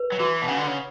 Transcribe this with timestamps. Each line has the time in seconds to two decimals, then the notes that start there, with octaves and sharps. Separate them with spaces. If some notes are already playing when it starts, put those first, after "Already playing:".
Already playing: B4
0.12 F#3
0.19 E3 F#4
0.42 B2
0.48 C#3 F#5
0.58 D3
0.67 C#3